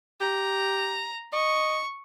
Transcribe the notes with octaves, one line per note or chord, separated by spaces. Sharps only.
G4 A#5
D#5 C#6